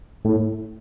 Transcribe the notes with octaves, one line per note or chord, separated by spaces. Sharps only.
A2